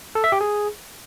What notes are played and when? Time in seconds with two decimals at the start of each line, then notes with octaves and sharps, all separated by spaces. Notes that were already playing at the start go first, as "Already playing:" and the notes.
0.15 A4
0.24 E5
0.32 G4
0.41 G#4